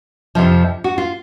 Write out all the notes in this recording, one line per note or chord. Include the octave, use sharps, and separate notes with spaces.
F2 C3 F3
F#4
F4